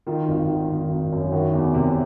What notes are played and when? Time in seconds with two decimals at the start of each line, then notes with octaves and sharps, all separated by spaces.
0.07 D#3 D#4 F4
0.28 G#1
0.49 D#3
0.69 G#1
0.90 G#1
1.12 F#2
1.32 D#3 E4 F#4
1.53 E2
1.74 C3